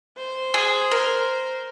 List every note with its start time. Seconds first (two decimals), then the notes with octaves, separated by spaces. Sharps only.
0.18 C5
0.54 G#4
0.91 A#4